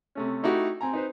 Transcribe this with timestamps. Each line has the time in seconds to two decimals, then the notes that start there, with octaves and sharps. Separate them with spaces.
0.15 C3 A3 C#4
0.43 A3 D#4 E4 F#4 G4
0.81 C4 G#5 A#5
0.93 D#4 B4 C5